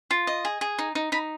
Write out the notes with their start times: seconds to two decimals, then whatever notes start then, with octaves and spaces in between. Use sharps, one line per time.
0.11 F4
0.27 D#5
0.45 G#4
0.61 G#4
0.78 D#4
0.95 D#4
1.12 D#4 B5